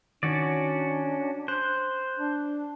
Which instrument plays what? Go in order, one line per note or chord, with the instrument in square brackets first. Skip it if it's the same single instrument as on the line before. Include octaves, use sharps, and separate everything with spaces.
[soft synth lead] D#3 [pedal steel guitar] C#4 F#4 D5 [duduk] D4
[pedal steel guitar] C5 [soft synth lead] F#6
[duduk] D4